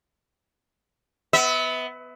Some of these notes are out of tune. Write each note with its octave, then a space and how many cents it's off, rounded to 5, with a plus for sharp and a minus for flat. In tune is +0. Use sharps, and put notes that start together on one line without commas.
B3 +15 E5 -30